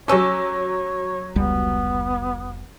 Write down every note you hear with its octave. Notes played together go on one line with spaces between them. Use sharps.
F#3 A3 C#4 G4 C#5 E6
F1 C#2 G3 B3